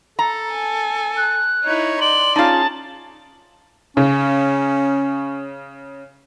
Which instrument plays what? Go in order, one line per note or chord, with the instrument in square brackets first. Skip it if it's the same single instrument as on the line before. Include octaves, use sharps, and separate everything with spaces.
[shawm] A4 [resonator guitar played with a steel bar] A#5
[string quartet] G#5 A5
[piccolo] F#6
[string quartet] D#4 E4 [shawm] C#5
[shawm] D5 [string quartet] C6 [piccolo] F#7
[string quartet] C#4 G#4 [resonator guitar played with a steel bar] D#4 F4 [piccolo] A5
[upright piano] C#3 [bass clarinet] C#4